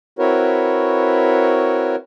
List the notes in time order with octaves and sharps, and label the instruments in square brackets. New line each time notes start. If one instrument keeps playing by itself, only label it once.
[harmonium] C4 E4 F#4 A#4 B4 C#5